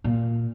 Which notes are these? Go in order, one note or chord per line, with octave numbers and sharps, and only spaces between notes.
A#2